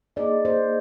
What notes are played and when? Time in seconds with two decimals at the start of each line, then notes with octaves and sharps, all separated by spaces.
0.16 A#3 D#4 G#4 D5 D#5
0.45 C5